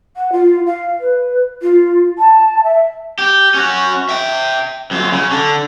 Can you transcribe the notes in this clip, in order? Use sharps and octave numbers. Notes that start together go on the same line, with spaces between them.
F#5
F4
F5
B4
F4
A5
E5
G4
C#4 F#4
E5 G5
F#2 F4
C#3
D3 D4